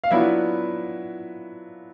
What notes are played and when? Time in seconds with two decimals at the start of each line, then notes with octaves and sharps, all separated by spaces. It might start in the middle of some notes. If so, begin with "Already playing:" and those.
0.04 F5
0.11 F#3 B3 D4 E4 F4 E5